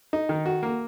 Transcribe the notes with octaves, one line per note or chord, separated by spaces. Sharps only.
D#4
D#3
F#4
A#3